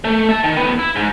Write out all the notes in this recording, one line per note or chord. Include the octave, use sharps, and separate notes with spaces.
A3
E5 A5
D#3
A2 B3
E4
G#2